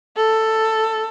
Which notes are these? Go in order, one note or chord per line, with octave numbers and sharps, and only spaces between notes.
A4